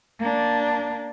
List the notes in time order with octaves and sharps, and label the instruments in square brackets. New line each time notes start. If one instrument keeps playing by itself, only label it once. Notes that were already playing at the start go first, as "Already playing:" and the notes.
[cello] A#3 D4